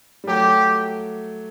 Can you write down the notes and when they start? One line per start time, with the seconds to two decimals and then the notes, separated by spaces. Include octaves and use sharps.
0.24 G3
0.28 F#3 A3 G4